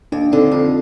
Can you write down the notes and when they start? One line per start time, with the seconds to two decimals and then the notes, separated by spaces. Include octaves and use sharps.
0.12 D#2 D4
0.32 D3 C4 D#4
0.52 F2 C4